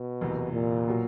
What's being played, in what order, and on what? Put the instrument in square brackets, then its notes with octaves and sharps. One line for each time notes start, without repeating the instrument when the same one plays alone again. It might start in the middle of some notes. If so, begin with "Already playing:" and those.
Already playing: [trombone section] B2
[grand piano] F#1 E2 C3
[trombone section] A#2
[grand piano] B2 F#3